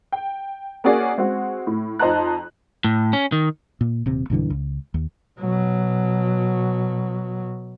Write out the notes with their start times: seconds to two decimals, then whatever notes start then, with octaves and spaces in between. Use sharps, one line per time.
0.12 G5
0.84 A#3 C#4 F#4 G#4 D5 G#5
1.18 G#3 C4 F#4
1.67 A2
1.99 F2 D#4 C5 A5 A#5 F#6
2.84 A2
3.13 C#4
3.32 D#3
3.81 A#2
4.06 D#1 C3
4.30 B1 G2 D3 E3
4.50 C#2
4.94 D#2
5.40 B2 F#3